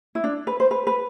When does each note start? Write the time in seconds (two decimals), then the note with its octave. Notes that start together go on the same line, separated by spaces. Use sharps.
0.15 E4
0.24 D4
0.47 B4
0.60 C5
0.71 B4
0.87 B4